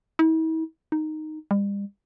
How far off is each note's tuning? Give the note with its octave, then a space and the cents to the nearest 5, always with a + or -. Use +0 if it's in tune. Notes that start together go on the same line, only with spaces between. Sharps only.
E4 -45
D#4 -5
G3 +40